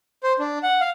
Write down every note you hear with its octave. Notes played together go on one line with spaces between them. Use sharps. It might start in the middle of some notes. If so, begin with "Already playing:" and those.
C5
D4
F#5
F5